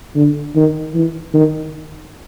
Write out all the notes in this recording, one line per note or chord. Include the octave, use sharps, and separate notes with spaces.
D3
D#3
E3
D#3